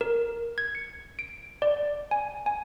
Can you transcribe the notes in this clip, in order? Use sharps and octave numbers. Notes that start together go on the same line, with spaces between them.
A#4
G#6
C#7
D7
D5
G#5
G#5